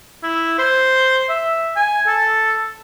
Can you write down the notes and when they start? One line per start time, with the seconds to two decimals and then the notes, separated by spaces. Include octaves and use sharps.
0.23 E4
0.59 C5
1.29 E5
1.76 G#5
2.07 A4